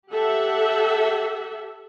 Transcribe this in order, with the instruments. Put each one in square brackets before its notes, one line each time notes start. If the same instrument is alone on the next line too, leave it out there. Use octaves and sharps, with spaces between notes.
[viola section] G4 A4 E5 F#5